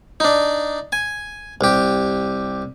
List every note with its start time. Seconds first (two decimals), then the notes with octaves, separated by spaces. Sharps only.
0.20 D4 D#4
0.92 G#5
1.61 C2 G4